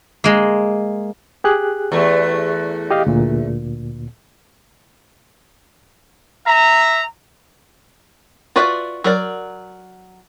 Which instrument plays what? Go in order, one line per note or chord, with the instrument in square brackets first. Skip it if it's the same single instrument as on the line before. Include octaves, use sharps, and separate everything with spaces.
[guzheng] G#3 A#3
[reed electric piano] G4 G#4 F#6
[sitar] E2 A3
[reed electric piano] G4 D#5 F5
D2 A#2
[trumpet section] E5 A#5
[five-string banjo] F4 F#4 B4 D5 E5
F#3 A#4 D5